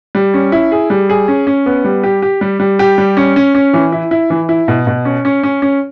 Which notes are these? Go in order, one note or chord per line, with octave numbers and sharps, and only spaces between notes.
G3
C#4
E4
G#4
G3
G#4
C#4
C#4
B3
G3
G4
G4
G3
G3
G4
G3
C#4
C#4
C#4
E3
E4
E4
E3
E4
B2
B2
C#4
C#4
C#4
C#4